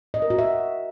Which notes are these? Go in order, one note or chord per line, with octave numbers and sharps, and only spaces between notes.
D#5
A#4
F#4
E5